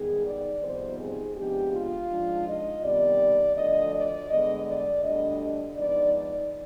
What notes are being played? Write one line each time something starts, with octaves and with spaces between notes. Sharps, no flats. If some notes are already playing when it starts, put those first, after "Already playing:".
Already playing: G#2 D#3 G3 B3 G#4
D5
F2 C3 G3 B3 D#4 C5
G#4
C3 F3 G#3 B3 D4 G4
F4
G#2 F3 G#3 D4
D#5
C3 D#3 G3 B3 D5
D2 D3 F3 D#5
D5
G2 D3 G#3 B3 D#5
D5
D2 D3 G3 D4 D#5
G#2 F3 B3 D#4 D5
D5